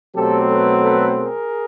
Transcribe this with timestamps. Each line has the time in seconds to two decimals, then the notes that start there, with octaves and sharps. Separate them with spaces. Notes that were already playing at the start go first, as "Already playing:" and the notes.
0.15 B2 F#3 A3 C4 G4 A4
0.50 A4 B4
0.84 A4 B4
1.19 G#4 A#4